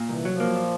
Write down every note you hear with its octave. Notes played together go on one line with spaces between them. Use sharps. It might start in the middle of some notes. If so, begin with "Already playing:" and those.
Already playing: A#2
C2 E3
F#3
F3
A#3
A#2